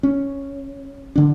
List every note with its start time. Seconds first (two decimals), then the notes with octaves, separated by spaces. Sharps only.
0.03 C#4
1.16 D3 D4